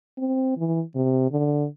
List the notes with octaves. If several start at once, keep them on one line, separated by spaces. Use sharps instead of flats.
C4
E3
C3
D3